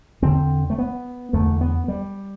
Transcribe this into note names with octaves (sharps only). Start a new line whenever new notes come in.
E2 D3 C4
A3
B3
E2 D3 A3
B3
G3